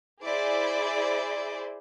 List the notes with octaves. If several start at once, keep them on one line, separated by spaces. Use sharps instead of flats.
E4 G#4 C5 D5